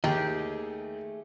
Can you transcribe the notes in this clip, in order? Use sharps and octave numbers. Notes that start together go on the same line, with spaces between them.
D#2 A3 G4 G#4 D#5